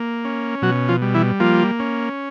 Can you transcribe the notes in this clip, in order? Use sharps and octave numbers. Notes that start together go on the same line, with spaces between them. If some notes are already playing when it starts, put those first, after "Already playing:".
Already playing: A#3
C#4
B2 F#3 F#4
F3 F4
G3
E3 E4
F3 A#3 F4
C#4